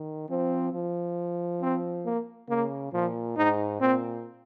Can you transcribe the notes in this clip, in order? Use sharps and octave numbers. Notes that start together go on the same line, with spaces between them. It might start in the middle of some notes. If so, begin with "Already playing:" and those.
Already playing: D#3
F3 C4
F3
C4
A#3
C#3 A#3
A#2 F3
G#2 D#4
A#2 C4